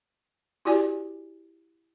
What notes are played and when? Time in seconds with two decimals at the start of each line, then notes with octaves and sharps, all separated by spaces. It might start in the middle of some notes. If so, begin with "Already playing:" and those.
0.65 E4 F#4 G4 D5 G#5